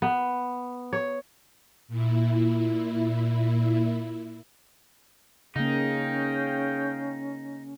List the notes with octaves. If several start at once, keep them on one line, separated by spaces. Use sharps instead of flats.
B3
C#5
A#2 E4
C#3 A#3 C#4 D#4 G#4 F5 G5